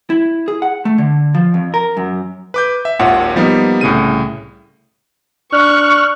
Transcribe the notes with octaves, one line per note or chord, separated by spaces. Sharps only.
E4
G#4
F#5
A3
D3
F3
F2
A#4
F#2
B4 D6 G6
E5
G#1 D#2 A#2 F4 C#5 F#5
F3 G3 A#3 B3 D#4
C2 A2 C#3 D#7
D4 C#6 F6 F#6